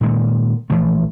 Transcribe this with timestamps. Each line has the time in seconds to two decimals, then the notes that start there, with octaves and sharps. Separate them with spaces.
0.01 A#2 D#3 G#3
0.70 A#1 E3 F3 A3